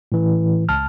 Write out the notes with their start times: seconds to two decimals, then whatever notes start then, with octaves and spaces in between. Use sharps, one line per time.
0.12 A2 E3
0.69 C#2 A5 F6